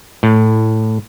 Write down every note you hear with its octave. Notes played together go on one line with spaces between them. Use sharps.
A2